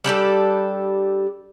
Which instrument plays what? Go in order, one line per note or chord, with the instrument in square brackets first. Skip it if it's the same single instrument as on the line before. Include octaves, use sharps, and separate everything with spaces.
[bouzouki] G3 D4 G4 A4